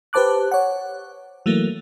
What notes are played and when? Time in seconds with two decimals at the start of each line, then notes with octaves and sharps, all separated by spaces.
0.13 G4 B4 C5 A5 D6 F#6
0.51 C#5 F#5
1.46 E3 F#3 A3 A#3